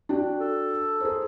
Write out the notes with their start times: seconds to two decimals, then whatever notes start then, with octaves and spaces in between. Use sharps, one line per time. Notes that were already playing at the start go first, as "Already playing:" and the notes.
0.09 D4 F#4 G5
0.39 A4
1.00 G#4 A#4 C5